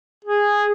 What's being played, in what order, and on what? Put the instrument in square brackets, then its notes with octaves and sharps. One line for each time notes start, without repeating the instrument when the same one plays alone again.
[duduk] G#4